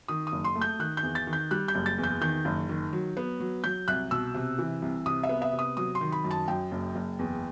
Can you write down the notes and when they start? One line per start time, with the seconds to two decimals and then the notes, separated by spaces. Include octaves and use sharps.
0.08 D#3 D#6
0.27 D#6
0.32 F#1
0.44 C6
0.55 A3
0.61 G6
0.79 D#3 F#6
0.97 G6
1.03 E2
1.15 A6
1.27 D#3
1.33 G6
1.51 G3 F#6
1.68 G6
1.75 F#1
1.86 A6
1.98 E2
2.03 G6
2.21 D#3 G6
2.45 F#1
2.69 D#3
2.93 F#3
3.17 B3
3.40 F#3
3.64 F#3 G6
3.88 C2 F#6
4.11 B2 E6
4.34 C3
4.59 E3
4.82 C2
5.06 C3 D#6
5.23 E5
5.29 B3
5.42 E5
5.53 C3
5.59 D#6
5.77 F#3 D#6
5.95 C6
6.01 D#3
6.12 B5
6.24 F#2
6.31 A5
6.48 F#2 G5
6.71 F#1
6.95 F#1
7.19 E2